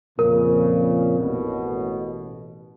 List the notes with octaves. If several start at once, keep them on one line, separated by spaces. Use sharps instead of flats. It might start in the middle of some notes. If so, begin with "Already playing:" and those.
F2 A#2 C#3 A#4
A1 B2